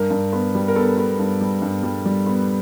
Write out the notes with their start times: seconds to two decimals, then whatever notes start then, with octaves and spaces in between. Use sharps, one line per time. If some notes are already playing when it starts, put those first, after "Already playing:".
Already playing: G2 A#4
0.10 G2
0.33 B3
0.55 G3
0.68 A#4
0.76 B3 A4
0.97 B3
1.19 G2
1.41 G3
1.62 G2
1.83 G3
2.06 G3
2.26 B3